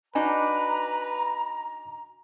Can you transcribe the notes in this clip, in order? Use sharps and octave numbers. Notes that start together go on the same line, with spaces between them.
D4 D#4 F#4 B4 G#5 A#5